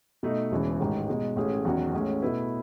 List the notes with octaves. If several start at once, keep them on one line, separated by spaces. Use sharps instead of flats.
B2 A3 D#4
E1 E2 C#3 E3
A1 G#2 D#3
B2 G#3 D#4
A1 A2 G#3 C#4 G#4
E2 D#3 F#3 C#4 F#4
A1 A2 G#3 C#4
B2 A3 E4 B4